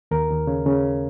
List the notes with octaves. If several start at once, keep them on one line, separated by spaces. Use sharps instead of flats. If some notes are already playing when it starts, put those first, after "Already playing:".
D#2 A#4
D#2
C#3
C#3